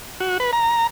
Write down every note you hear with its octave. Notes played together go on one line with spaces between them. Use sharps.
F#4
B4
A#5